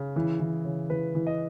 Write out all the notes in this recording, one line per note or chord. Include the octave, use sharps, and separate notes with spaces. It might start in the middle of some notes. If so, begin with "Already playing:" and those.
Already playing: C#3
E3
E3
C#3
E3 B4
E3
D#5